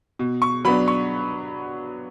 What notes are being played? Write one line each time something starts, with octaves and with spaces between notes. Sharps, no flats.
B2
C#6
F#3 B3 D4 B5
C#6